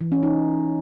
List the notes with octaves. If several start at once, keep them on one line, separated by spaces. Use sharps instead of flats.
E3
C#4
D#4